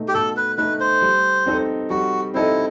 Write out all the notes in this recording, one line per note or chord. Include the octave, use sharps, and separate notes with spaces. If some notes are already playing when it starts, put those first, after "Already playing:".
Already playing: B2 A3 D#4
G4
B2 A4
B4
A3 D#4 B4
C5
G3
C4 D#4 A4 D#5
G3 F#4
C4 D#4 E4 A4 D#5